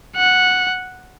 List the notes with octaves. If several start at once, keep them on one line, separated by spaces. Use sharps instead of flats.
F#5